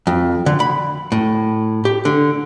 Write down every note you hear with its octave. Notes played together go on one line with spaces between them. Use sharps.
F2
D3
B5
A2
G4
D3